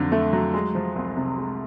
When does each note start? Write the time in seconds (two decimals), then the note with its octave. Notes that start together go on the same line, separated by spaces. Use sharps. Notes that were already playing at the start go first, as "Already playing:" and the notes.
Already playing: F2 D3 F#3
0.12 A3
0.33 F#3
0.54 G#3
0.75 F3
0.96 C2
1.17 C3
1.37 G#3